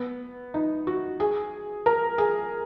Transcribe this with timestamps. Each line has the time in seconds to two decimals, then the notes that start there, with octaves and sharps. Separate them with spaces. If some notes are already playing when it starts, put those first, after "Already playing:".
Already playing: B3
0.54 D#4
0.87 F#4
1.20 G#4
1.86 A#4
2.18 G#4